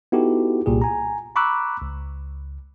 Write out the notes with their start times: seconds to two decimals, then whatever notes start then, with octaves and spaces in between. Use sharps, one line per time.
0.12 B3 D#4 E4 F#4 G4 A4
0.66 C2 A#2 G4 G#4
0.82 G#5 A#5
1.36 A#5 B5 C#6 D6 E6 F#6
1.82 C#2